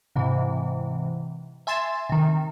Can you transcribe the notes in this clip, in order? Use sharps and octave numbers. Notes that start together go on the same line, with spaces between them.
G#2 C3 E3
E5 G#5 C6 A6 E7
C3 D#3